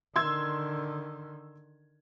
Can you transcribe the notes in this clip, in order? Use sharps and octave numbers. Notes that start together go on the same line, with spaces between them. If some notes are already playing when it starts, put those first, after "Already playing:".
D3 D#3 C6 E6 G#6